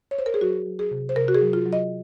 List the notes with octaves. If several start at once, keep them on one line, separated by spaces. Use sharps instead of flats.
C#5
C5
A#4
G#4
F#3 F#4
F#3
G#4
C3
C5
C3 A#4
F#4
G#4
F#3
F4
F#3
D#5